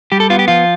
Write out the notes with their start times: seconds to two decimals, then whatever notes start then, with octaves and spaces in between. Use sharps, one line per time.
0.12 G3 G4
0.20 A4
0.30 B3 F4
0.39 G4
0.48 F3 F4